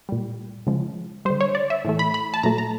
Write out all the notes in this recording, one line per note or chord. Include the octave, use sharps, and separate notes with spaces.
A#2 G3
C#3 F3 G#3
D3 G3 C5
C#5
D5
E5
A2 E3 A3
B5
B5
A5
A#2 F#3 A3 A#5
A#5